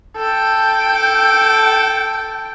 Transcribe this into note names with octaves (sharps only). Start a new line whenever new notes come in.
A4 G5